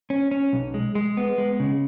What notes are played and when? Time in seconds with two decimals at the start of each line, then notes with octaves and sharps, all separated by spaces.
0.10 C#4
0.31 C#4
0.53 B1
0.74 G#3
0.95 G#3
1.17 B3
1.38 G#3
1.60 C#3